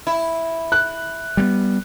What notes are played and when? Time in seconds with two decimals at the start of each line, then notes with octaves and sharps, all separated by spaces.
0.07 E4
0.72 F#6
1.37 G3 A3 B3